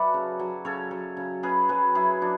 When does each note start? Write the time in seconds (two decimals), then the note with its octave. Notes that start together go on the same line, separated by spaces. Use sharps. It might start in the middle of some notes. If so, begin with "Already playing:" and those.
Already playing: F#3 A4 B4 D5 E5
0.14 C#3
0.39 F#3
0.65 C#3 A4 C#5
0.91 F#3
1.17 C#3
1.43 C#3 G#4 B4
1.69 F#3 G#4 B4
1.95 F#3 E4 G#4
2.22 F#3 D4